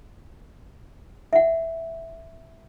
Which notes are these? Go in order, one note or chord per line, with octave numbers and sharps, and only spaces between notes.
E5 F#5